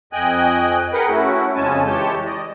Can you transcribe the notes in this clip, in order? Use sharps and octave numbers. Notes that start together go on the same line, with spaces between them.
F2 D#5 G5 G#5 F#6
G#4 A#4 B4 F#5 G5
A3 C#4 E4 F#4
F2 C#3 G#3 C#4 G#5 A5
E3 G#3 G4 C#5 A5 G6
D5 D#5